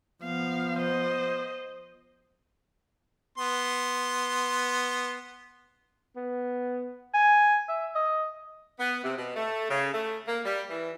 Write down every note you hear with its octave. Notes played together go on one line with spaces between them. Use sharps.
F3 B3 F5
C5 D#5
B3 C6
B3
G#5
E5
D#5
B3
C3
B2
A3
C#3
A3
A#3
G3
E3